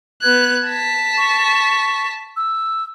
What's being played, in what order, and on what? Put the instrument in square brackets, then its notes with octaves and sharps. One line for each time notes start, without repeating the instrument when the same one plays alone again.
[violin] B3 F#6 [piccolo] G#6
[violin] A5 B6
[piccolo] C#6
E6